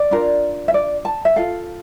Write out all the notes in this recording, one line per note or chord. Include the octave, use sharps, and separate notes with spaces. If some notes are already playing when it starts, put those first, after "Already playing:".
Already playing: D5
D4 F4 A#4
E5
D5
A5
E5
F4 A4 F5